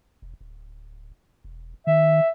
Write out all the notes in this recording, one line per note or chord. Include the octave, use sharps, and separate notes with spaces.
E1
D1
E1
D#3 E5